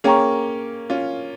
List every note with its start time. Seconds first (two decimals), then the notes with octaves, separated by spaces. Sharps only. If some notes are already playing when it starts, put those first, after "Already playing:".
0.04 A#3 C#4 G#4 C#5 G5 A#5 C#6
0.90 C#4 F4